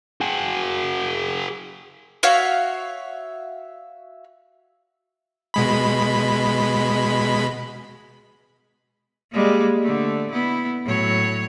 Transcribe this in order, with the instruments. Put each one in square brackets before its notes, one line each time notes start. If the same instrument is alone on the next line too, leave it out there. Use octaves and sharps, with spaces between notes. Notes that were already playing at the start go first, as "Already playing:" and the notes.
[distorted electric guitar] F#4 G#4
[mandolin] F#4 C#5 E5 F5
[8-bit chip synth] B2 G#3 B5
[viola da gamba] G3 G#3 A#3
D3 A3
B3 E4
A2 F#3 C#5